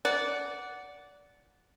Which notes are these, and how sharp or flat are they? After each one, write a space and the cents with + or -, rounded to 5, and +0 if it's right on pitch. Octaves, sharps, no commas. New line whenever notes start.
D5 -20 F#5 +0